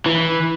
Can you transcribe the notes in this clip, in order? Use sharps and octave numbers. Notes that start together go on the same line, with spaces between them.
E3